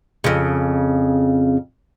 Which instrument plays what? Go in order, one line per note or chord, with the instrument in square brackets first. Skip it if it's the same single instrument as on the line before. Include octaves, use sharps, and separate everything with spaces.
[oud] F2 C#3